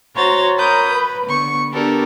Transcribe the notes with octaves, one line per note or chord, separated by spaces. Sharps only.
F#4 C5 C#5 A#5 A6
A#4 C#5 B5 D#6 G6
B4
D3 B3 C#6
B3 D4 G4 A4 A#4